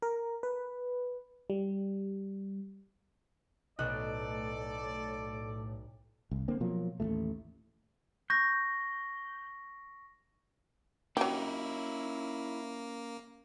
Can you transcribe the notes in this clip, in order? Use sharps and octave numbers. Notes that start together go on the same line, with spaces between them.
A#4
B4
G3
B1 A2 A4 D5 D#5 F#6
C2
D3 A#3 C4
B2 F3 F#3 A#3
A1 D#2 A#2 A3
C#6 G6 A#6
F#3 A#3 C#4 D#4 E4 G4